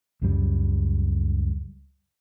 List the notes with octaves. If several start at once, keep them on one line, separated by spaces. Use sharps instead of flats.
C#2 F#2 G3